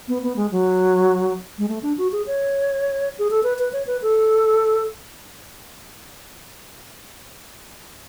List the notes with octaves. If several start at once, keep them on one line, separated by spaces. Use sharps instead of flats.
B3
B3
G#3
F#3
G#3
A3
D4
F#4
G#4
C#5
G#4
A4
B4
B4
C#5
B4
A4